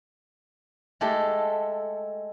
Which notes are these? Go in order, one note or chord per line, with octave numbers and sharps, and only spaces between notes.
G#3 A3 G4 A4